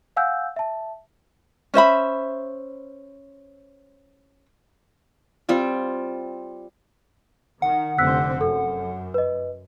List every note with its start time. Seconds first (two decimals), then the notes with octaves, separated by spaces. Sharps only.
0.17 F5 F#5 G#5 E6 F#6 G6
0.56 E5 A5
1.74 C#4 C5 E5 B5
5.49 G3 C4 F4
7.62 D#3 F#5
7.98 F1 D3 C4 E6 F#6 B6
8.41 F#2 A4
9.14 B4 D#5